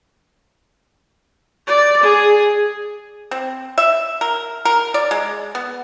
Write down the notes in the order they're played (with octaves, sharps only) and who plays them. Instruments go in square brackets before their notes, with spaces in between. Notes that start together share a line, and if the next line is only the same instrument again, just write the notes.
[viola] D5
G#4
[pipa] C4
E5
A#4
A#4
D5
G#3
B3